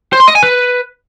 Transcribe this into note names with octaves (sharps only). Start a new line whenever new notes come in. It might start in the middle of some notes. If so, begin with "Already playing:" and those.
C5
C6
D#5
G#5
B4